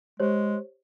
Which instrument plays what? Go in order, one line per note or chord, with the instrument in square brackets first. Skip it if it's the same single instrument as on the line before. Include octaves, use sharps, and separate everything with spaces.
[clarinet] G#3 [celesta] G4 C5 C#5